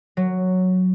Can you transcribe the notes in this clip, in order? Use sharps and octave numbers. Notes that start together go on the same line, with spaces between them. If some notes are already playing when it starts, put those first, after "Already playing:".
F#3